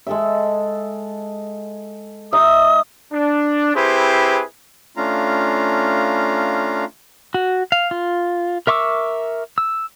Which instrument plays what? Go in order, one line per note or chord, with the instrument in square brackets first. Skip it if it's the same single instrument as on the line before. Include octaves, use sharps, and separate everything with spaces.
[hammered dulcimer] G#3 A4 E5
[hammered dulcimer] D#4 E5 [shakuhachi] D#6
[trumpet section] D4
C4 E4 G4 G#4 B4 C5
[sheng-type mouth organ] A3 C#4 D4 F4 F5 A#5
[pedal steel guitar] F#4
F5
F4
A#4 E5 C#6 D6 E6
E6